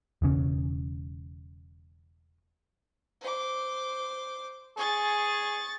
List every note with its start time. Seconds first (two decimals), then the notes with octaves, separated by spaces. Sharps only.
0.22 E1 C#3 C#4
3.21 C5 D6
4.77 G#4 C#6 A6